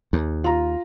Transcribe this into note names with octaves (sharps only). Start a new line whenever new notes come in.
D#2
F4 A#5